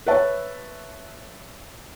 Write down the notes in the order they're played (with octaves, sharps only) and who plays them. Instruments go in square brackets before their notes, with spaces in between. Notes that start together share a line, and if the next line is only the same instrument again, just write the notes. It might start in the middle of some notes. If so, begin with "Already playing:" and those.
[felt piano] B4 C#5 E5 A5